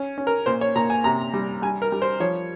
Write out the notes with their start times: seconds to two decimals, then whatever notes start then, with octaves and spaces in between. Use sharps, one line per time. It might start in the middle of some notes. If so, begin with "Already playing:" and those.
Already playing: C#4
0.18 C#4
0.27 A#4
0.46 A#2 C5
0.61 C#5
0.76 A#2 A#5
0.90 G#5
1.04 C3 A#5
1.34 G3
1.62 G3 G#5
1.82 A#4
1.92 G3
2.02 C5
2.20 F3 C#5